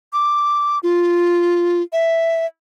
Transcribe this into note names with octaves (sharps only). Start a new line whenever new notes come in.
D6
F4
E5